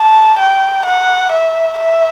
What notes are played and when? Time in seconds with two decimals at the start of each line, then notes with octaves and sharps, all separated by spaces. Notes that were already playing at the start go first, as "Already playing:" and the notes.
Already playing: A5
0.39 G5
0.86 F#5
1.32 E5
1.79 E5